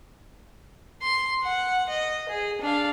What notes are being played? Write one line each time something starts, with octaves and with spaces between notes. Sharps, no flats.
C6
F#5
D#5
G#4
D4 F5